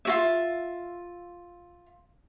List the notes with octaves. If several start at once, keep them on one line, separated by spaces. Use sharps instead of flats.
F4 F#4 E5